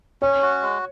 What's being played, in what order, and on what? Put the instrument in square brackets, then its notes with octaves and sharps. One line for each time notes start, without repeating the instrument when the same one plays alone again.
[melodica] C#4 [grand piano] C#5
[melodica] F#4
G#3